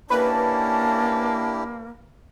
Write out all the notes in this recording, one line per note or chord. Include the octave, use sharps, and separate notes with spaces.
A#3 C#4 D4 E4 G4 B4 A5